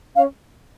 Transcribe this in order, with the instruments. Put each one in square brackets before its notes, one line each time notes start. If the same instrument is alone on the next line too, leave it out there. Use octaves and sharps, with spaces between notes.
[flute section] C#4 F5